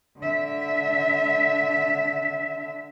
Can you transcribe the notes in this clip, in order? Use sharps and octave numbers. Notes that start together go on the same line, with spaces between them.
D3 E5